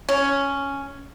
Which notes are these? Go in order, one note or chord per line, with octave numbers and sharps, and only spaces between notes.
C#4